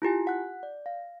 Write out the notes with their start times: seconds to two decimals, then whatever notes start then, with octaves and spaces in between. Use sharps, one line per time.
0.02 E4 F4 G4 G#5
0.27 F#5 F#6
0.63 D5
0.86 F5